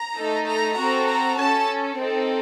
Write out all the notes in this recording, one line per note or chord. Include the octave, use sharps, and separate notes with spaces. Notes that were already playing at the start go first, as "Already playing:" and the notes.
Already playing: A#5
A3 D#4 A4
A#5
C4 F#4 A4 A#5
A#5
C#4 A4 A5
C4 D#4 A4